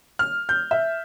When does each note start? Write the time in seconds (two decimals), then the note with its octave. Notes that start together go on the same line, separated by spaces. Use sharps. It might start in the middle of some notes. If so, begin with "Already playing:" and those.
0.19 F6
0.49 G6
0.71 E5